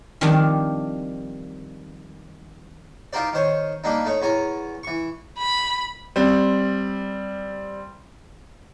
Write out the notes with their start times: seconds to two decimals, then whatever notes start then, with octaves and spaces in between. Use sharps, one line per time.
0.21 D#3 F3 G3 C4 D4
3.13 D#4 F4 G4 A#4 C5 D5
3.33 D#3 C5 C#5
3.84 G3 A#3 D4 D#4
4.06 A3 D#4 C#5
4.22 E2 C#5 G#5 A#5
4.83 E3 C#6
5.39 B5
6.16 G3 C4